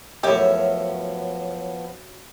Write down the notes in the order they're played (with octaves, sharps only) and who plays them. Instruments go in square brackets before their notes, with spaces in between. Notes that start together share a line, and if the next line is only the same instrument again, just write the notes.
[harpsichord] F#2 A2 [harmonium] F3 B3 [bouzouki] C#4 F#4 E5 [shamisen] G4